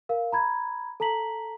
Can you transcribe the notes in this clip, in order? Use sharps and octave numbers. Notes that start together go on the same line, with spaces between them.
A#4 F5
A#5 B5 G#6
A4 A5 A#5 B6 F#7